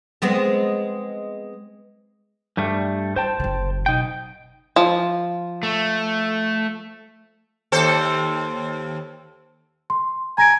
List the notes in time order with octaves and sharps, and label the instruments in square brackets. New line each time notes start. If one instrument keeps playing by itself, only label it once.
[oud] G#3 B3 C4
[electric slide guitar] G2 G3 A3
[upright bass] E4 [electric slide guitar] C5 G5 A5
[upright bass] F#1 C#3
[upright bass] B2 F#3 [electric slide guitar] D#4 G5
[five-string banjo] F3
[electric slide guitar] A3
[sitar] D#2 A4 C5
[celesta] C6
[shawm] G#5 [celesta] A#5 A#6 D7